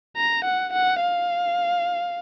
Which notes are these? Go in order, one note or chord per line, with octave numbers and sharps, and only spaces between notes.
A#5
F#5
F#5
F5